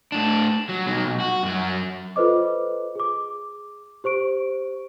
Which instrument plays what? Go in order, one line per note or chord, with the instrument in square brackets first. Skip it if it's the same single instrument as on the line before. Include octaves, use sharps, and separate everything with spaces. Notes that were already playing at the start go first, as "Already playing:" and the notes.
[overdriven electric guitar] A2 D4
F#3
B2 F#3
B1
F#4
F#2 F#3
[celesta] F4 A4 B4 C5 D#5 D6
G#4 D6
G4 C5 C#6 D7